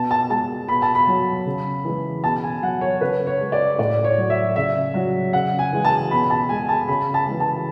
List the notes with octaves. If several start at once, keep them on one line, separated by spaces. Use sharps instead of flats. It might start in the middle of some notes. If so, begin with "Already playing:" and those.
Already playing: B2 A5
A5
G#3 A5
B2 B5
A5
B5
F#3
C#3
E3 G#3
B2 A5
G#5
F#3 F#5
C#5
C#3 B4
C#5
G#3
D5
A2 D5
C#5
F#3
E5
C#3 E5
F#3
C#3 F#5
G#5
E3 G#3
A5
B2 B5
A5
G#3 G#5
A5
C#3 B5
A5
E3 G#3
A5